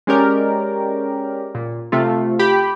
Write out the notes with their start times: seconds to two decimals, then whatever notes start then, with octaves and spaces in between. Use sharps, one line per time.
0.07 G#3 C#4 G4 A#4 D5
1.55 A#2
1.92 C3 A3 F4
2.39 G4 B5